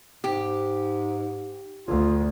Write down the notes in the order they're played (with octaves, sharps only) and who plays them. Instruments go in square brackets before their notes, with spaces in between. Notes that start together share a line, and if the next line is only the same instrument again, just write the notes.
[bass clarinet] G#2 [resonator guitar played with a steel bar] G4
[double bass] D2 [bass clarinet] F4